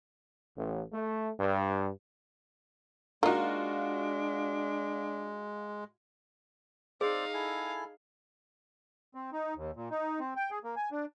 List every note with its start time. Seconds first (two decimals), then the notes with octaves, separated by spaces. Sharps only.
0.56 A1
0.93 A3
1.40 G2
3.23 G#3 A#3 D4 D#4 F4 F#4
7.01 C4 D#4 G#4 C5 D5 F5
7.34 E4 A4 G#5
9.15 C4
9.32 D#4
9.56 D#2
9.76 A#2
9.91 D#4
10.20 C4
10.37 G5
10.51 G#4
10.64 A#3
10.76 G#5
10.92 D4